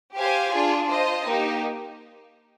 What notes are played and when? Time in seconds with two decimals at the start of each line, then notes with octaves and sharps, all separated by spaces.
0.14 G4 C5 F5 G#5
0.52 D4 F4 G#4
0.88 F4 C5 D#5
1.25 A#3 D#4 G4